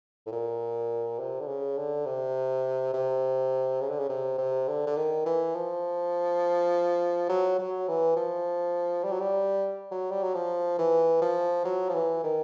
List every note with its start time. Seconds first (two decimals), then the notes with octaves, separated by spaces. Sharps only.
0.27 A2
0.32 A#2
1.19 C3
1.41 D3
1.48 C#3
1.78 D3
2.06 C3
2.94 C3
3.81 C#3
3.89 D3
4.00 C#3
4.09 C3
4.38 C3
4.68 D3
4.87 D3
4.97 D#3
5.26 E3
5.55 F3
7.29 F#3
7.59 F#3
7.88 E3
8.17 F3
9.04 G3
9.12 F#3
9.20 G3
9.91 F#3
10.11 G3
10.23 F#3
10.34 F3
10.79 E3
11.22 F3
11.65 F#3
11.89 F3
11.94 E3
12.24 D#3